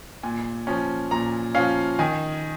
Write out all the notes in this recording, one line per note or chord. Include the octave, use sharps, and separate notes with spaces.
A#2 G#5
F3 C#4
A#2 A#5
F3 C#4 F5
D#3 G#5